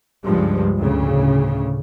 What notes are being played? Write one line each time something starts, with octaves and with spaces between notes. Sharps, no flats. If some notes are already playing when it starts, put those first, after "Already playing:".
C#2 G2 F3 G#3
D2 A2 C#3